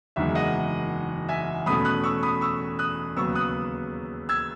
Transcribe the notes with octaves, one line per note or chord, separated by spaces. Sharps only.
F#1 E2 D#3 G#3 E5
D#5 F#5
E5 G#5
E2 B2 A3 C#4 B5 D#6
D#6 F#6
C#6 E6
B5 D#6
C#6 E6
D#6 F#6
D#2 C#3 F#3 B3 C#6 E6
D#6 F#6
E6 G#6